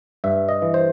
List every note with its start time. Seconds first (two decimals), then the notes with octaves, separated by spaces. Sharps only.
0.24 G2 E5
0.49 D#5
0.62 E3
0.74 C5